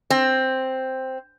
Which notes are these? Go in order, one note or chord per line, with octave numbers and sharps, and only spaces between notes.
C4